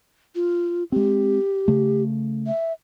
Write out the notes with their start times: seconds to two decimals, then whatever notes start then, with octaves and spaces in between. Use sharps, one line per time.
0.35 F4
0.92 G#3 C4 G4
1.68 C#3 A3
2.47 E5